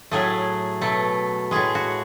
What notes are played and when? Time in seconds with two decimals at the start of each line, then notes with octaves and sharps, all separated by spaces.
0.11 A2 F#3 A3 G#4
0.81 B2 F#3 A3
1.51 A2 G#3 G#4
1.75 F#4